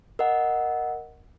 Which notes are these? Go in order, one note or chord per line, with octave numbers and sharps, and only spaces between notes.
A#4 D#5 F#5